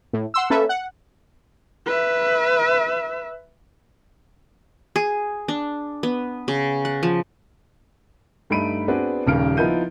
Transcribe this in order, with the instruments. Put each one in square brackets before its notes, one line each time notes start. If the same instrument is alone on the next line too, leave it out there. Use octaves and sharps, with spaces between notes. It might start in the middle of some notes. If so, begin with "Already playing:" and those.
[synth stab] A2
F#5 C6 E6
A#3 C#4 A4 B4 E5
F#5
[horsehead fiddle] B4 E5
[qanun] G#4
D4
B3
C#3
F#5
F3
[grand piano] G2 A3 D#4 B5 D7 D#7
B3 C4 D4 F#4 G#4 B4
D#1 D#2 C#3 G3 F6 D7
F3 B3 D#4 E4 G6 D#7